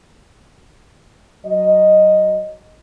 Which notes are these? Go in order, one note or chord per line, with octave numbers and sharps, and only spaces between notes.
F#3 D#5